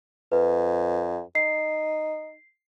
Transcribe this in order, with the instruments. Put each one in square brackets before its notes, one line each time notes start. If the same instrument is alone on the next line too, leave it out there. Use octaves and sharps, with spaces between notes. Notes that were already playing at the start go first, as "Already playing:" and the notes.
[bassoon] F2 [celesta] B4
[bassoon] D#4 [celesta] C7